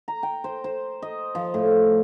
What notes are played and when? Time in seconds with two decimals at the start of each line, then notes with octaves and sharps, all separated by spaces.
0.08 A#5
0.23 G5
0.44 C5
0.64 C5
1.02 D#5
1.35 F3
1.54 A2